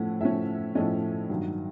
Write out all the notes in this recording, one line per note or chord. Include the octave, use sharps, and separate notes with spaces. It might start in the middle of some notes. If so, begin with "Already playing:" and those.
Already playing: A2 F3 A3 C#4 F#5
A2 F3 A3 C#4 E5
A2 F3 A3 C#4 D#5
G2 D#3 F#3